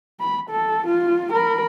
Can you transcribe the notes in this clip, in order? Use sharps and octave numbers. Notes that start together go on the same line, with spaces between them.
B5
A4
F4
A#4 B5